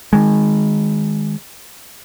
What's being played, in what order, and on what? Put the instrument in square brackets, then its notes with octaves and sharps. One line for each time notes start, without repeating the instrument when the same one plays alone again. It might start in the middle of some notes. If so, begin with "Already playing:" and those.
[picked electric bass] D#3 G#3